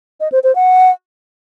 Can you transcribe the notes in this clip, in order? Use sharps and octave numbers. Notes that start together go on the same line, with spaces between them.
D#5
C5
C5
F#5